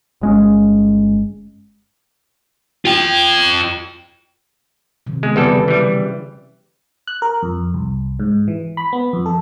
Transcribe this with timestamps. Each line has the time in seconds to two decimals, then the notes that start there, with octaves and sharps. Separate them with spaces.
0.21 G1 G#3 C#4
2.85 F4 G5
5.07 C3 D#3 F#3
5.23 G#3 B3
5.36 E2 C#3 G3 G4 A4 B4
5.68 E3 G3 C#4
7.08 F#6
7.22 A#4
7.42 F2
7.74 C2
8.19 G#2
8.48 E3
8.77 B5
8.93 B3
9.13 F2
9.26 A4